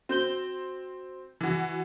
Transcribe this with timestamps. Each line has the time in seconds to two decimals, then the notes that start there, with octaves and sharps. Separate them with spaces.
0.09 C4 F#4 G6 G7
1.41 E3 F#4